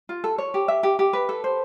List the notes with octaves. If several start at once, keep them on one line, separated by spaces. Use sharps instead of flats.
F4
A4
C#5
G4
E5
G4
G4
B4
A4
C5